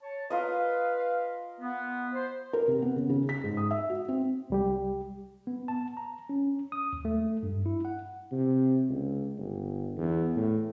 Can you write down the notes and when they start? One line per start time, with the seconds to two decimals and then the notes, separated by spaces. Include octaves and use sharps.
0.02 C#5 A5
0.30 F4 A#4 B4 D#5 F5
1.61 B3
2.13 C5
2.53 A#4
2.68 C3
2.82 B3
2.96 C#3
3.09 C#3
3.29 B6
3.44 G#2
3.57 D#6
3.71 E5
3.90 F#4
4.08 C4
4.50 C2 G3 G4
5.47 B3
5.68 A5
5.97 A#5
6.29 C#4
6.72 D#6
6.93 D#2
7.05 A3
7.43 G2
7.66 E4
7.85 F#5
8.32 C3
8.89 C#2
9.38 G1
9.97 E2
10.36 A2